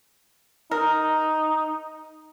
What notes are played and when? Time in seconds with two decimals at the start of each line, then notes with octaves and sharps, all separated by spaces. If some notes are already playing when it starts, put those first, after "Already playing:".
0.71 D#4 A#4